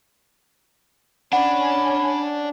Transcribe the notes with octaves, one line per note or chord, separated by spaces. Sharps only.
C#4 D4 F#5 B5